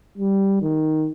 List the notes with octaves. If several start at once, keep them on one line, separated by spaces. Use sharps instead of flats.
G3
D#3